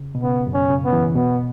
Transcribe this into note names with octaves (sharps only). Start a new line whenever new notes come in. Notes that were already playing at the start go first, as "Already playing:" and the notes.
Already playing: C#3
B2
C#3 B3
F#2
C#4
C#3
B3
E3
B2 B3